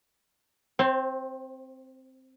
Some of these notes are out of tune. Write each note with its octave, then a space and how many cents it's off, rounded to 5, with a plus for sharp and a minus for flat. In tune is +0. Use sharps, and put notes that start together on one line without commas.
C4 +0 C5 +35